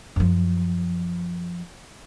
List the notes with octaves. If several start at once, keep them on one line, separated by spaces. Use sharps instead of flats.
F#2 F3